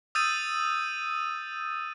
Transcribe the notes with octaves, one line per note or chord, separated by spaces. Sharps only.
D#6 E6 G6 A6 D#7